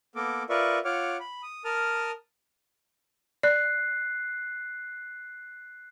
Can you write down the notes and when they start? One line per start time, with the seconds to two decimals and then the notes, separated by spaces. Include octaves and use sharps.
0.16 A#3 B3 A4 A#4 D6
0.49 F4 A#4 B4 D5 E5 C#6
0.85 F4 C#5 F#5 D6 F6
1.20 B5
1.43 D#6
1.65 A#4 A5 D#6 F6
3.43 D5 F#6 C7